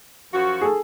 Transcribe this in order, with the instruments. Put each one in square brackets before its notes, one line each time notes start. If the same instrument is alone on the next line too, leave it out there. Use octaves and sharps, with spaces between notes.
[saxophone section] F#2 F3 F#4
[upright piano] G#4 A4